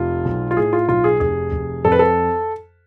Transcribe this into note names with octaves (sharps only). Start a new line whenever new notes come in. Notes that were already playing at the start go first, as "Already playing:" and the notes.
Already playing: F1 F4
B1
F4
A2 G#4
F4
B1 F4
G#4
F1 G#4
F1
F2 A4
B4
A4